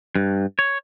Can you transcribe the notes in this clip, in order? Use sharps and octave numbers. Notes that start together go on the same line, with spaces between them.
G2
C#5